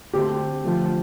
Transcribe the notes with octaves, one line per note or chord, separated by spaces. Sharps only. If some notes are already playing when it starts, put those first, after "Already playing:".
D3 A3 C4 G4
D3 F3 A3